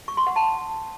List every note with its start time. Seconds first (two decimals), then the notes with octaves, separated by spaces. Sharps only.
0.08 C#6
0.17 C6
0.27 F#5
0.36 A5